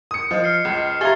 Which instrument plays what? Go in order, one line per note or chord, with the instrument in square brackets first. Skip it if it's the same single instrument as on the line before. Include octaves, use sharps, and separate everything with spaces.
[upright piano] D#6 C#7
[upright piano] F3 [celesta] C5 D#5
[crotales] F6 C7 C#7
[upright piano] C#2
[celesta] G4 E5 F5 [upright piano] G#4 A#5 [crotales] A6 G7